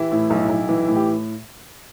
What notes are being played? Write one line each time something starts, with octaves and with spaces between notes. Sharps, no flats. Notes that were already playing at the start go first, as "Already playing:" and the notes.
Already playing: E3 E4 G4
A2
B1
B1
E3
A2
G4